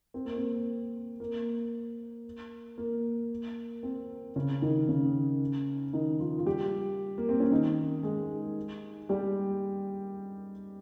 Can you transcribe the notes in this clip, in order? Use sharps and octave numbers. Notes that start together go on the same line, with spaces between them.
C4
A#3
C4
A#3
A#3
C4
C#3 C#4
D#3 D#4
C#3 C#4
D#3 D#4
F3 F4
F4
G3 G4
A#3
C4
C#4
D#3 D#4
G#3 G#4
G3 G4